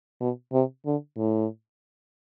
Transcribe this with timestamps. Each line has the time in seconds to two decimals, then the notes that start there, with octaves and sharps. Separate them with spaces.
0.21 B2
0.53 C3
0.86 D3
1.17 A2